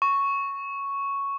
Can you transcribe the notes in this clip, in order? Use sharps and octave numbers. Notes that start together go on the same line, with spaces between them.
C#6